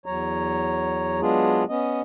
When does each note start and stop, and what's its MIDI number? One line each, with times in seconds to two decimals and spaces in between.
0.06 1.20 40
0.06 1.20 54
0.06 1.20 73
0.06 1.20 82
1.21 1.64 54
1.21 1.64 56
1.21 1.64 59
1.21 1.64 62
1.21 1.64 65
1.21 1.64 68
1.69 2.02 59
1.69 2.02 61
1.69 2.02 75